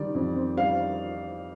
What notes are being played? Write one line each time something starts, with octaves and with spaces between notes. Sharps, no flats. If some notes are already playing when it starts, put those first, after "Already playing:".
Already playing: D#3 G3 D5
F2
C4
G3 F5